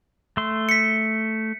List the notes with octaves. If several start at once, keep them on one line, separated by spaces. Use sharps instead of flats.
A3 C6
B6 C#7